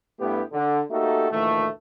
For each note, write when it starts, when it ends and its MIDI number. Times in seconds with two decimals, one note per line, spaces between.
0.20 0.42 43
0.20 0.42 57
0.20 0.42 59
0.20 0.42 64
0.20 0.42 67
0.53 0.81 50
0.91 1.28 57
0.91 1.28 58
0.91 1.28 63
0.91 1.28 66
0.91 1.28 67
0.91 1.28 69
1.31 1.69 38
1.31 1.69 46
1.31 1.69 51
1.31 1.69 52
1.31 1.69 57